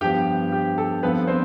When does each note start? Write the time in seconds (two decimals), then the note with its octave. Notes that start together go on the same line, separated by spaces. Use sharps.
0.01 G2 F3 B3 G4 G5
0.52 G4
0.78 A4
1.03 G2 F3 B3 C4 B4
1.27 C4 C5